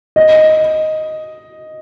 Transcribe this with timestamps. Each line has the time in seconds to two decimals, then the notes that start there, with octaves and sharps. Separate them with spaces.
0.16 D#5